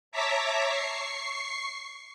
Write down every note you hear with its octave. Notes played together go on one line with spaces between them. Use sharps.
C#5 E5 A5 A#5 D6 B6
C#6 C7